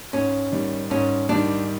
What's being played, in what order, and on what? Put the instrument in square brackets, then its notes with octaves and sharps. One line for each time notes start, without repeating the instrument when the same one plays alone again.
[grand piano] G#2 [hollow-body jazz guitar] C#4
[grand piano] D#3 G3
[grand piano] G#2 [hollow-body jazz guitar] C#4
[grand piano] D#3 G3 [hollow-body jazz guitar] D4